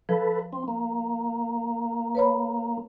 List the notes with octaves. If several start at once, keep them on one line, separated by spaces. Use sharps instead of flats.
F3 A4 B4
C4
A#3
B4 C#5 B5